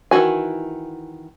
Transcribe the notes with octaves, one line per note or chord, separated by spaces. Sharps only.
D#3 E3 D#4 F#4 G#5